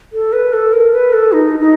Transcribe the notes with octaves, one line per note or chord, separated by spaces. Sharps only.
A4
B4
A4
A#4
B4
A4
D#4
D#4